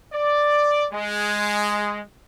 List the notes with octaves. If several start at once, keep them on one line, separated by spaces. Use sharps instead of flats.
D5
G#3